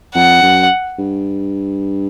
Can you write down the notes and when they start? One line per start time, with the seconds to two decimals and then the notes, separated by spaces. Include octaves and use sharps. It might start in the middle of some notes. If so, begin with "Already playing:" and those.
0.14 F2 F#5
0.42 F#2
0.98 G2